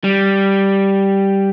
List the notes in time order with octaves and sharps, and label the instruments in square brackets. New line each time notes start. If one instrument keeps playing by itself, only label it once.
[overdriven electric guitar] G3